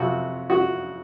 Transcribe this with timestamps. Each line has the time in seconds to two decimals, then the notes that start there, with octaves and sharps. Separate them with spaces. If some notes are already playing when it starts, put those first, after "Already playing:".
Already playing: F2 C3 F#3 F#4
0.50 F#4